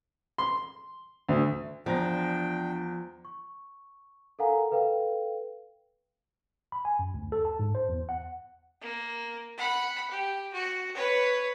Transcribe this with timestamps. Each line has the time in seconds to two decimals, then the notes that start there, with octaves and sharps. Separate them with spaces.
0.38 C6
1.29 D2
1.86 E2 F3 D4 G5 A#5 A#6
3.25 C#6
4.39 A4 A#4 F5 F#5 G#5 A#5
4.71 A4 B4 F5 G5
6.72 B5
6.85 G#5
6.99 F#2
7.14 D2
7.32 A4
7.45 A5
7.59 G#2
7.75 C5
7.89 E2
8.09 F#5
8.81 A#3
9.58 F#5 B5
10.11 G4
10.53 F#4
10.95 B4 C#5